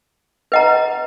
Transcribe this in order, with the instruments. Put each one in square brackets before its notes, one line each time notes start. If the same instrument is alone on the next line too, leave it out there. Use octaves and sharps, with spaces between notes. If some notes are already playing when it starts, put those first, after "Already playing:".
[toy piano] B4 D#5 F#5 A#5